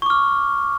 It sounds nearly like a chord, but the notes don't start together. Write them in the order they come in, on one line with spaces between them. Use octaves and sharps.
C#6 D6 F6